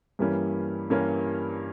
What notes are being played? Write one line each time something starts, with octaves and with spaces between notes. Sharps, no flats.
G2 E3 G3 A#3 C#4
G2 E3 G3 A#3 C#4